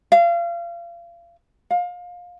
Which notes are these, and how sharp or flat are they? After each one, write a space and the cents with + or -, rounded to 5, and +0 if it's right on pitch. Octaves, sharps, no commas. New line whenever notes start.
F5 -30
F5 +25